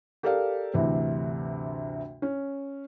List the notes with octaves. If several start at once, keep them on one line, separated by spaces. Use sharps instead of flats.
G4 A4 A#4 D5 F5
D2 G2 C3 E3
C#4